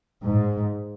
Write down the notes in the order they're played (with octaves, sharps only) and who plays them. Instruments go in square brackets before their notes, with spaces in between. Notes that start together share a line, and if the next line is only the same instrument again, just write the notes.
[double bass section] G#2